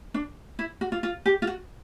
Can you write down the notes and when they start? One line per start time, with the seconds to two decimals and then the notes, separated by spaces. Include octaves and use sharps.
0.14 D4
0.59 E4
0.81 F#4
0.92 F4
1.03 F4
1.26 G4
1.42 F4
1.47 F#4